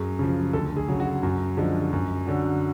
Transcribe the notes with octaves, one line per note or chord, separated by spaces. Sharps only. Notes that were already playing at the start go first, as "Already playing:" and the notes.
Already playing: F#2 G#4
C#3 F3
D2 A4
G#4
C#3 F#3
F#4
F#2
D3 F3 G#3
F#2
D3 F#3